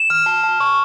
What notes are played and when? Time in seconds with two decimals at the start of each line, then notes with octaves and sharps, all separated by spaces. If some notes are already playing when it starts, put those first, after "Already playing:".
Already playing: E7
0.10 F6
0.26 A5
0.43 A5
0.60 C#6